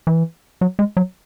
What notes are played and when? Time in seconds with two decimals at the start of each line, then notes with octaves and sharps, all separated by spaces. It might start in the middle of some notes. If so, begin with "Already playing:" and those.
0.07 E3
0.61 F#3
0.79 G#3
0.97 F#3